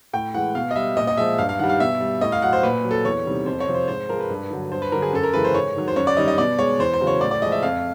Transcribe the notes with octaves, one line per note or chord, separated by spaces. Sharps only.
A2 G5
E3 G#3 F#5
B2 F5
D#5
G3 E5
A#2 D#5
D#5
F3 G#3 E5
G2 F5
F5
D#3 G3 F#5
F5
B2 E5
G3
A2 D#5
F5
F#3 F#5
C5
A#2 B4
F#3
A4
E2 C#5
C3 D#3 G3
F2 C5
C#5
C3 F3
C5
G#2 C5
F3 G#3 A#4
B4
G2
D3 F#3
G2 C5
B4
D3 F#3 A#4
G#4
F#2 A4
A#4
C#3 E3 G#3 B4
C5
G#2 C#5
D#3 F#3
C5
F#2 C#5
D5
D#3 G3 D#5
D#5
B2 D5
G#3 C#5
E2 C5
C5
C#3 F#3
C#5
A2 D5
D5
F3 G#3 D#5
E5
F2 F5